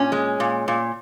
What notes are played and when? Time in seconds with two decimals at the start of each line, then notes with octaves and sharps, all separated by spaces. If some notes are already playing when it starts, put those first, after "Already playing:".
Already playing: A#2 C#4
0.12 G#3
0.40 A#2
0.68 A#2